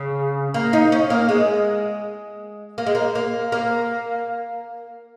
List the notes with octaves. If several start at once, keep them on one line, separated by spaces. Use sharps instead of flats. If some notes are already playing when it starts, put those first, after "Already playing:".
Already playing: C#3
A#3
D#4
C#4
A#3
G#3
A#3
G#3
A#3
A#3
A#3